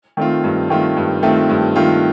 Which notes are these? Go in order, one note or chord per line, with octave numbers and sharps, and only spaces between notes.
D#3 A3 C4 F4
G2
D#3 A3 C4 F4
G2
D#3 A3 C4 F4
G2
D#3 A3 C4 F4